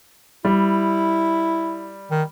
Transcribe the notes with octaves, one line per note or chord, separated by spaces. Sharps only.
G3 E4
D#3